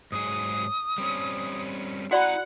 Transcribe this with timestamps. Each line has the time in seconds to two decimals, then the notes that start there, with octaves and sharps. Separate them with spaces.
0.12 G#2 F#3 G#4 D#6
0.98 G3 C4 C#4
2.11 E4 F#4 D5 F#5 A#5 B5